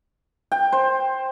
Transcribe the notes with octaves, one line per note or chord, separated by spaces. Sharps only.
G5
C5